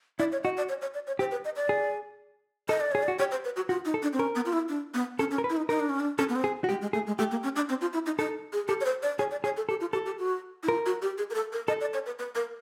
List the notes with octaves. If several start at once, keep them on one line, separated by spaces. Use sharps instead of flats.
E4 D5
C#5
F#4 D#5
D5
C#5
C#5
D5
C#5
G4 C5
B4
D#5
D5
G#4
A4 D#5
D5
G#4 C#5
D5
F#4
G4 C#5
C5
B4
F#4
F4 F#4
D#4
A4
D4
C4
C#4 A#4
B3
F4
E4
D4
B3
C#4 A4
C#4
A#4
B4
E4
D#4
D#4 A#4
D4
C#4
D4
C#4 A4
B3
C4
G#4
F#4
G#3 G4
G#3
A3 G#4
G#3
A3 G4
A#3
C#4
D4
C4
F4
E4
D#4
D#4 A4
G#4
G4 A4
C#5
C5
D5
G#4 C#5
D5
G#4 C#5
A4
G4 A4
F4
G4 A4
G4
F#4
E4
F4 A#4
F#4
G4
G#4
A#4
A4
A#4
A4 D#5
D5
C#5
B4
B4
A#4